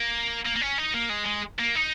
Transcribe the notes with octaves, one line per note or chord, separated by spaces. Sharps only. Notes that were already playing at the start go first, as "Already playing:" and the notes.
Already playing: A#3
A#3
A#3
C#4
D#4
A#3
G#3
G#3
A#3
D#4